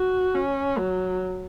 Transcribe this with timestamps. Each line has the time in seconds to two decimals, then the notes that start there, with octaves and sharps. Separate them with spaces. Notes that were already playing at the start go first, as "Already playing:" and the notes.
Already playing: F#4
0.35 C#4
0.78 F#3